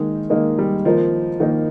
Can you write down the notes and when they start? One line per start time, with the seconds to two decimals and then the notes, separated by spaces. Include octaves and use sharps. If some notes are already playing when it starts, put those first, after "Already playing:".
Already playing: D#3 G#3 A#3 D#4 A#4
0.30 D#3 G#3 A#3 D#4 A#4
0.58 G3
0.85 D#3 F3 A#3 D#4 A#4
1.40 D#3 A#3 D#4 A#4